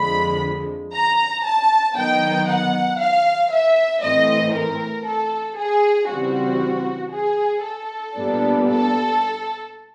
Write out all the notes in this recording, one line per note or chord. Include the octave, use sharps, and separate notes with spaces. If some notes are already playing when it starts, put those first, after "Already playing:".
Already playing: F2 D3 F3 G#3 B5
A#5
A5
D#3 F#3 B3 D#4 G5
F#5
F5
E5
A2 E3 A3 C4 D#5
A#4
A4
G#4
C#3 E3 G3 C4 F#4
G#4
A4
A#2 G3 B3 D4
A4